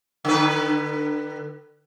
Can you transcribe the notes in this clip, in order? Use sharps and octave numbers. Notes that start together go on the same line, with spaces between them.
D3 B4